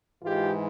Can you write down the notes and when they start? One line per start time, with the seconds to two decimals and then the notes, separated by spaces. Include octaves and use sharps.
0.23 G#2 E3 G#3 F4 G4